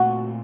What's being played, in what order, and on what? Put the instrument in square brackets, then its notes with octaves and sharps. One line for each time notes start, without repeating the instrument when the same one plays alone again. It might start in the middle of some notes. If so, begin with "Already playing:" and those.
Already playing: [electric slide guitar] A#2 A3 C4 F4 [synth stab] F#4